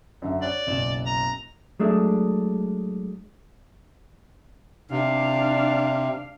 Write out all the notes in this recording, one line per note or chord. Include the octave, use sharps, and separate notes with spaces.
F#2 D3 E5
C#5 D5 F#6
F#1 B1 E7
A#5
F#3 G#3 A3 D4
C3 D4 F5